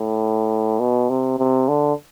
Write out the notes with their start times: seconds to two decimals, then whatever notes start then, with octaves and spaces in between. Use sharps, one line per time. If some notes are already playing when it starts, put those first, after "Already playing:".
Already playing: A2
0.80 B2
1.10 C3
1.38 C3
1.68 D3